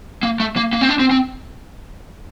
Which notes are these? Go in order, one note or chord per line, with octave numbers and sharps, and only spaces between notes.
A#3
A3
A#3
A#3
C4
D4
C4
C4